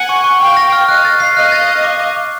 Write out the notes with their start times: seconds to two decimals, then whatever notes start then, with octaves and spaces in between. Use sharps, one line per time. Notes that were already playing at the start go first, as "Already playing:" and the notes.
Already playing: F#5 G#5
0.09 C#6
0.24 C#6
0.40 F5 G5 C#6
0.57 A#6
0.72 F6
0.88 D#5 F5 F#6
1.05 A6
1.20 C7
1.36 D#5 F5 F#6
1.52 A6
1.68 F#6
1.84 D6
2.00 D6
2.16 D6